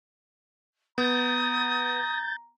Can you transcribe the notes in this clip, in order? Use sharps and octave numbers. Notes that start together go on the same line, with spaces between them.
B3 A#5 D#6 G6 A6